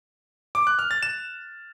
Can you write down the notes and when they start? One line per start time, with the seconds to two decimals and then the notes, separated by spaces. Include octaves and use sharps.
0.55 D6
0.67 F#6
0.79 F6
0.91 A6
1.03 E7